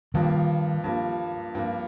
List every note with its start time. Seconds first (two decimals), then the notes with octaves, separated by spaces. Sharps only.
0.14 G2 D#3 F3 G3 A#3
0.84 G2 F3 A#3
1.55 G2 F3 A#3